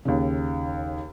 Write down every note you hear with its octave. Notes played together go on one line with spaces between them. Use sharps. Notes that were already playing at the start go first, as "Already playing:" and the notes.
D#2 C#3